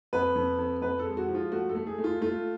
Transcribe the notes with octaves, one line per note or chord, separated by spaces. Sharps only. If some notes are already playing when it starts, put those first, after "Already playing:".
F2 B4
F2
F2
F2 B4
A4
G#3
F#4
F3
F4
A3 F#4
A4
A3
G#4
A3
F4
A3 F4